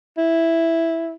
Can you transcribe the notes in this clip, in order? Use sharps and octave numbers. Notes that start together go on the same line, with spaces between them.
E4